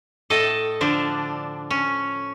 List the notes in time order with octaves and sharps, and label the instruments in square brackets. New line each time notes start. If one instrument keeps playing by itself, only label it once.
[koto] A2 A4 D#5
D3 F3 D4
C#4